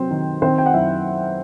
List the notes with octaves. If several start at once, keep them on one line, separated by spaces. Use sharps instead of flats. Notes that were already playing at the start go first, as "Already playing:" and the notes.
Already playing: C3 F#3 C4 C5
D#3
D#3 C4 C5
G5
F#5
F#2 E4 E5